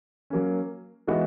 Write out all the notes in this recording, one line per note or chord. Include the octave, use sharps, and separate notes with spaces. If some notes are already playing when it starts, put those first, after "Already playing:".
F#3 A#3 C#4
E3 G#3 B3 D#4 F#4